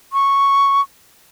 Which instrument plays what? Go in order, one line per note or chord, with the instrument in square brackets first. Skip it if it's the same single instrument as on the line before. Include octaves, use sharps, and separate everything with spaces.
[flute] C#6